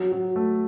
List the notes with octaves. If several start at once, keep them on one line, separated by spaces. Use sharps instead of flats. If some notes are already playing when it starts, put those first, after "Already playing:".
Already playing: F#3
F#3
A3